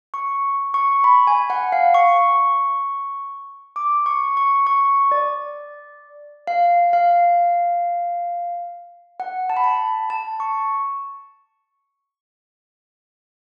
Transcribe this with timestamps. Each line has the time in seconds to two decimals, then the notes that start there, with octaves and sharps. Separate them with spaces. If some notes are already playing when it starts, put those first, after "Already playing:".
0.14 C#6
0.74 C#6
1.04 B5
1.27 G#5
1.50 F#5
1.72 F5
1.94 C#6
3.76 D6
4.06 C#6
4.37 C#6
4.67 C#6
5.12 D5
6.47 F5
6.93 F5
9.20 F#5
9.50 A5
9.57 B5
9.64 A5
10.10 A5
10.40 C#6